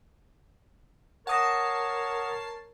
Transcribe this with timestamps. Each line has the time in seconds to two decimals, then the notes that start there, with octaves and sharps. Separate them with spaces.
1.27 A#4 C#5 F#5 A5 D#6 A#6 C7